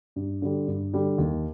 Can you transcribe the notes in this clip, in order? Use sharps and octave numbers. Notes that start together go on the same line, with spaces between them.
G2
D3 G3
G2
D3 G3
D#2